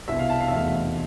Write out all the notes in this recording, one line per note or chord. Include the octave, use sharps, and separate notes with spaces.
C2 B2 B3 E4 E5
F5
A5
F5
E5
F1 E2 B2 A3 F5